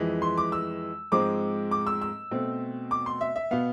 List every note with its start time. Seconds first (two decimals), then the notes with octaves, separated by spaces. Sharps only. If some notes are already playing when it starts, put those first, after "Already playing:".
Already playing: F2 E3 G#3
0.22 C6
0.38 D6
0.52 E6
1.12 G#2 F3 G#3 C4 D6
1.71 D6
1.87 E6
2.02 E6
2.31 B2 A3 C4
2.91 D6
3.06 C6
3.21 E5
3.36 E5
3.51 B2 B3 F5